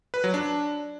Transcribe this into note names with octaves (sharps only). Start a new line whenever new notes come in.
B4
F#3
D4